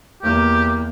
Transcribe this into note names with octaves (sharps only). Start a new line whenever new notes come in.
E2 A#3 G4